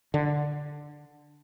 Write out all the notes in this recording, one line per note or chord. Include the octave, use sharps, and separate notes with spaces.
D3